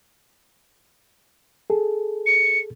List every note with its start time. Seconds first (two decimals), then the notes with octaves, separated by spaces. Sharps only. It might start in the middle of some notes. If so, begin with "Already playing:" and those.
1.70 G#4 A4
2.26 C#7